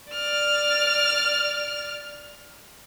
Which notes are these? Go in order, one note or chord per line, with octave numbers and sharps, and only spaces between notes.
D5 F6